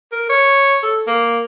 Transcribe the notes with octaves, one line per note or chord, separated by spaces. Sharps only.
A#4
C#5
A4
A#3